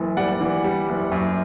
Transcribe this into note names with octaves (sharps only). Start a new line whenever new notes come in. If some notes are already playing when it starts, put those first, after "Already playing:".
Already playing: F#1 E3
G3 D5 F#5
E3
G3
F#1
F#2